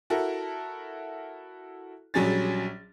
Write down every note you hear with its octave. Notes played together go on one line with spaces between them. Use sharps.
E4 F#4 A4 A#4
A#1 F#3 G3 C#4 G#4 A6